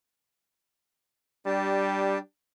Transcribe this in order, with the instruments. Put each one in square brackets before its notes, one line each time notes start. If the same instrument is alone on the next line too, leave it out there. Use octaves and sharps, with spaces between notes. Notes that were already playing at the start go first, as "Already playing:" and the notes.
[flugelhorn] G3 [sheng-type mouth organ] D4 G4 A5